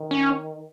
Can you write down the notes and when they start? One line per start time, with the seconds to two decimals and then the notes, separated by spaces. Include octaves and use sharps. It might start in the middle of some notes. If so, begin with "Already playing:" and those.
Already playing: D#3
0.11 C#4